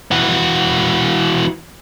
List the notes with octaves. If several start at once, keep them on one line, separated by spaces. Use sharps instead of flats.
E3 F#4